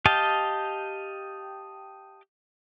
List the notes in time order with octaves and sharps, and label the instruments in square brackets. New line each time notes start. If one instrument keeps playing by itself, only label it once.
[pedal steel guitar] G4 D#5 F5 G5 A5